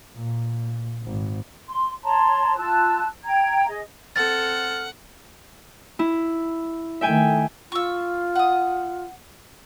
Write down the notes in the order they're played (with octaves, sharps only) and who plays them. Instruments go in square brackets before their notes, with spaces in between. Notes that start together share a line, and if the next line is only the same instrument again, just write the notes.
[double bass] A#2
G#1
[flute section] C6
C#5 A5 A#5 C6
F4 A5 E6 F#6
G5 A#5 G#6
G#4 D#5
[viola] C4 A4 [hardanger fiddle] F#5 [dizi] F6 [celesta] A6
[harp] E4
[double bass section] D#3 A3 [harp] E5 G5 G#5
[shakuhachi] F4 [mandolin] C#6 E6
[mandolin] F#5 D#6